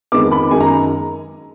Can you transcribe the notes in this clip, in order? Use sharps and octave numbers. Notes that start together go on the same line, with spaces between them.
F2 D#3 G#3 B3 D6
B5
F#2 D#3 G#3 G#5
A#5